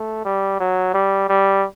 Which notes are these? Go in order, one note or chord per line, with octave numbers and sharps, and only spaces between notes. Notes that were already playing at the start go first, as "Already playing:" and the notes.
Already playing: A3
G3
F#3
G3
G3